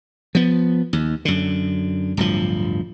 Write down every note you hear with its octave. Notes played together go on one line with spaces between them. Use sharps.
F3 B3
D#2
F#2 D3
D1 G2 F3